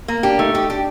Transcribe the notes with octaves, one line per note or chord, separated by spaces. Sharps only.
A#3
D4 G4
A3 D#4
D#4 G4
D4 G4